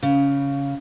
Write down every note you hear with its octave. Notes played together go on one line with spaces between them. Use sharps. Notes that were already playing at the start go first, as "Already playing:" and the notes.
C#3